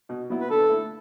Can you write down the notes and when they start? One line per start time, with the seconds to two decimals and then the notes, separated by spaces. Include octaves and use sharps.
0.09 B2
0.30 F#3 B3 E4
0.41 B4
0.49 D3 A4
0.70 A3 E4